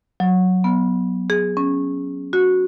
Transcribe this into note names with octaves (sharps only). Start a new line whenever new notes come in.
F#3
B3
G#4
C#4
F#4